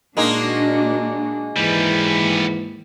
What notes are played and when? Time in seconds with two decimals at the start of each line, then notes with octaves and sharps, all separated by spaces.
0.17 A#2 G#3 A#3 D4 D#4 F#4
1.57 D#2 G#2 E3 G3 B3